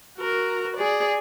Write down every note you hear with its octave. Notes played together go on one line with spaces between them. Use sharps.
F#4 A#4
G#4 D5